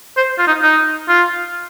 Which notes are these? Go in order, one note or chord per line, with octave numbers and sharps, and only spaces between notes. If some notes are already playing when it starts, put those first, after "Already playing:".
C5
F4
D#4
D#4
F4